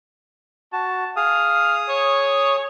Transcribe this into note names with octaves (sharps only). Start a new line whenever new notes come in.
F#4 A5
G#4 F5 D#6
C#5